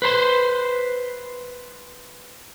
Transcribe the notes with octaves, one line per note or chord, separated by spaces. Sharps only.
B4 C5 B5 C6